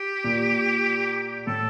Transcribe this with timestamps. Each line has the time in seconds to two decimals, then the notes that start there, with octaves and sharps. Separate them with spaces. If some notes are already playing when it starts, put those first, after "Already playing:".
Already playing: G4
0.24 A#2
1.47 A2 A4